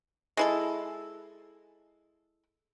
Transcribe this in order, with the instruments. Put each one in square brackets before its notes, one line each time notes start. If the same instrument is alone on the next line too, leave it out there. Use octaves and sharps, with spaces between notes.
[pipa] G#3 E4 A4